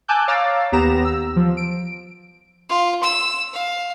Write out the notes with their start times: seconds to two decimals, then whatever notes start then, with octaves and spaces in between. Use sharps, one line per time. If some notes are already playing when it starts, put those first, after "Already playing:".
0.08 G#5 A5 D6 E6 F#6 G6
0.28 C#5 F5 A#5 D6 E6 A6
0.72 D#2 B3 G4 A#5 A#6 E7
1.05 E6
1.36 F3
1.57 D7
2.69 F4
3.03 E6
3.53 F5